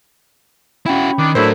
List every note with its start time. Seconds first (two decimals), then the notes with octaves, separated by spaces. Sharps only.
0.86 C#4 E4 F#4 G5 B5
1.19 D#3 D4
1.35 A2 F#3 D4 E4 A4 A#4 C5